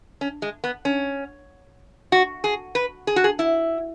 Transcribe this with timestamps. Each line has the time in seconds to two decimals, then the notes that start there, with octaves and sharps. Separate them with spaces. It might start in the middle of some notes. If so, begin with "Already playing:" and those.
0.21 C#4
0.42 G#3
0.64 B3
0.85 C#4
2.12 F#4
2.44 G#4
2.75 B4
3.07 G#4
3.16 F#4
3.24 G#4
3.39 E4